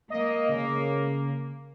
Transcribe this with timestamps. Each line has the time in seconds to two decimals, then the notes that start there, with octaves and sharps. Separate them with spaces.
0.10 A#3 D#5
0.49 C#3